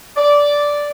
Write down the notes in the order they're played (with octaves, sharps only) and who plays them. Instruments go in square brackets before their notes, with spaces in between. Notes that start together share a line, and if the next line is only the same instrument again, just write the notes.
[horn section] D5